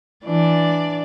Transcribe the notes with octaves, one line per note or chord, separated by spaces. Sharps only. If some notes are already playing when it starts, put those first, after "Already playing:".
E3 D4 D5